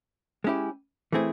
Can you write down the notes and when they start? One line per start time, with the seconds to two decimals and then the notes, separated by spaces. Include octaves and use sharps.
0.44 G#3 C#4 E4 G4
1.12 E3 A3 C4 E4 G#4